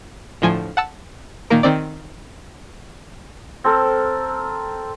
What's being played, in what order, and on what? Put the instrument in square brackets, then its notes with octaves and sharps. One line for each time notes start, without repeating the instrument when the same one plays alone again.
[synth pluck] D2 A2 F3 G#5 G#6
F#5 A5 E6
A#2 D#3 A#3 A#4
D#3 C4 D5
[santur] C4 A4 A#4